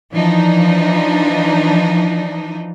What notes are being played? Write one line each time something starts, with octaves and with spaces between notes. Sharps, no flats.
E3 F3 D4 D#4